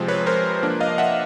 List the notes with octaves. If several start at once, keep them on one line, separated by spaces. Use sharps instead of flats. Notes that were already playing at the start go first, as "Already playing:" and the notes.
Already playing: C3 F3 G#3 C4
B4 C#5
A#4 C5
F3 A#3 D4
D#5 F5
E5 F#5